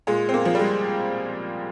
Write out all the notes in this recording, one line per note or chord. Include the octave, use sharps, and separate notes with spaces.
A#2 G#3
C4
A#3
F3
G3
G#3